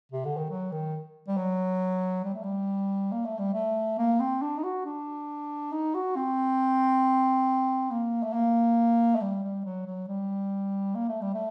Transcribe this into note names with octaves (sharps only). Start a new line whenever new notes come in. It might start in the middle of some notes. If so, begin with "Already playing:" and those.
C3
D3
D#3
F#3
D#3
G3
F#3
G3
A3
G3
A#3
A3
G3
A3
A#3
C4
D4
D#4
F#4
D4
D#4
F#4
C4
A#3
A3
A#3
A3
G3
G3
F#3
F#3
G3
A#3
A3
G3
A3